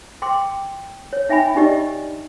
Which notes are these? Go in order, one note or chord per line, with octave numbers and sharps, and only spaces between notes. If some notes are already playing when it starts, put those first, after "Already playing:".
G5 C6 D6
C#5
D#4 E5 G5 G#5 B5
D4 D#4 G4 D5 D#5